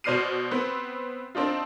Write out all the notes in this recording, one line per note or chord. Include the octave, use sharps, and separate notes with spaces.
B2 C5 D5 F6 C7 D#7
B3 C4
C4 D4 D#4 F4